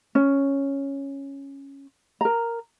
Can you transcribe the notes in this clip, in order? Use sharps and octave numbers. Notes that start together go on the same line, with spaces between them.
C#4
A#4 A#5